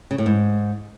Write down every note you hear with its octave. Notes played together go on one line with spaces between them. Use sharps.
C#3
A2
G#2